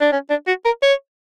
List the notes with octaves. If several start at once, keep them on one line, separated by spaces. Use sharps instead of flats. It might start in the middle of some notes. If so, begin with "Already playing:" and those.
D4
C#4
D4
F#4
A#4
C#5